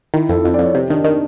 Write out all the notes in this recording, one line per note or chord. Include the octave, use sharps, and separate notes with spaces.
D#3 E4
F2 A4
F2
D5
F2
C#5
C3 G4
D#3 D4
D#3